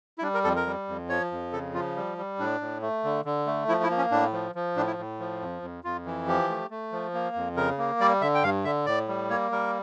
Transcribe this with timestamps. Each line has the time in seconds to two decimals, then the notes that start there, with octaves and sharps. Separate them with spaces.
0.18 E4
0.22 G3 D4
0.34 A#4
0.44 F2 A4
0.56 A#4
0.67 G3
0.88 F2
1.09 F3 C#5
1.32 F2
1.53 C#3 A4
1.74 F3 F4
1.96 G3
2.18 G3
2.39 A2 D4
2.61 A2
2.82 A3
3.04 D3
3.25 D3
3.47 A3
3.68 F3 E4
3.83 E4
3.90 A#3
3.98 C#4
4.11 A2 D4
4.33 F3
4.55 F3
4.76 A2 D4
4.87 E4
4.99 A2
5.20 F3
5.41 F2
5.62 F2
5.84 F2 F4
6.06 E3
6.27 F3 G4
6.50 A3
6.70 A3
6.92 F3
7.14 A#3
7.36 F2
7.56 C#3 A#4
7.78 A#3
8.00 G3 D5
8.21 D3 E5
8.35 G5
8.43 G2 F5
8.64 D3 E5
8.86 A2 D5
9.08 G3
9.30 A#3 C#5
9.51 G3 A#4